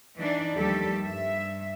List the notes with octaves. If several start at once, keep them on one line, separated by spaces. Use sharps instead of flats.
E3 D4 D#4
D#2 F3 G3 A3 G4 A4
G2 E5